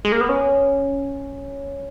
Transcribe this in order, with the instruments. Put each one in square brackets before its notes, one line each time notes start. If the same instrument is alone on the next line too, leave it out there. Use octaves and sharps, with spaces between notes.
[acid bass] G#3
A#3
B3
C#4